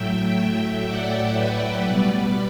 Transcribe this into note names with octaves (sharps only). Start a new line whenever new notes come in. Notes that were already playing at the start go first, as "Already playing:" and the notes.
Already playing: A2 F#3 A3 E5 G5
D5 F#5
B4 D5
B2 G3 B3